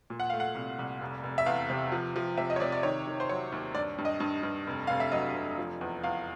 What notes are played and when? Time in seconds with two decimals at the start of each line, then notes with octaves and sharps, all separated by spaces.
0.10 A#2
0.20 F#5
0.30 A3 F5
0.40 F#5
0.55 C2
0.79 C2
1.01 F1
1.24 F1
1.38 E5
1.46 E2 F5
1.70 C3
1.92 F3
2.16 F3
2.37 C3 E5
2.50 D#5
2.56 C#5
2.60 C3 D5
2.72 D5
2.83 D#3 C#5
3.07 D#3
3.20 C5
3.29 F#3 C#5
3.52 D#2
3.74 G2 D5
3.98 G2
4.05 D#5
4.20 G2
4.43 G2
4.67 F1
4.87 F1 F5
5.00 E5
5.12 F#3 D#5
5.34 F1
5.58 F3
5.81 E2
6.03 E2 F5